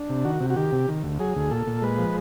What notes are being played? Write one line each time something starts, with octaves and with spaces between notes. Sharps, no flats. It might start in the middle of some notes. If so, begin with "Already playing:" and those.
Already playing: D4
C3
D#3 F#4
C3
F#4
D#3 G4
C3
D#3
D2
F#3 G#4
D2
A#2 A4
A#2
G#3 B4
F3